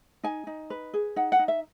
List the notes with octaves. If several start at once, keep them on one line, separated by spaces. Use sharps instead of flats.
D#4 G#5
D#4
B4
G#4
D#4 F#5
F#5
D#4
E5